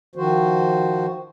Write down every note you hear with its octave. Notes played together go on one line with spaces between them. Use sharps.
D#3 F3 F#4 C5